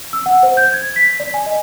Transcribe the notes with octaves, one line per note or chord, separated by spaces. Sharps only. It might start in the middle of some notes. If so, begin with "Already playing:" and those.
E6
F#5
C5
G6
G#6
B6
D5
G#5
D#5